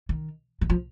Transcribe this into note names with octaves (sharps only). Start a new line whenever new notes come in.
D#3
D#3
F3